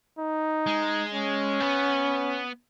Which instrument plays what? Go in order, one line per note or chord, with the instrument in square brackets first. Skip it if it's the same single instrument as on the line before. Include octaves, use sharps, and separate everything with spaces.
[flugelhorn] D#4
[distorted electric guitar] G#3
[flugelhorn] C#4
[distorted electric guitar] B3